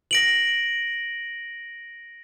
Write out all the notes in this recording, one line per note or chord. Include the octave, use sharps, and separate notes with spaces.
A#6 D7 F#7